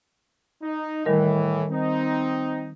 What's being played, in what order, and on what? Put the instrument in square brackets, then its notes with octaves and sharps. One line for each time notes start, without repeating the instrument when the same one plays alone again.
[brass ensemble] D#4
[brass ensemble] A2 E3 [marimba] D#3 G3 A#4
[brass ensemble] C4 D#4